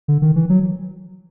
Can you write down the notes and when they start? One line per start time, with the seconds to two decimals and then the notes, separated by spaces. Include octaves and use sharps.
0.08 D3
0.22 D#3
0.36 E3
0.50 F#3